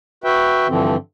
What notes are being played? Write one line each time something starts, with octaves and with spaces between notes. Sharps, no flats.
F#4 B4 E5 G5
G2 D3 E3 F3 C4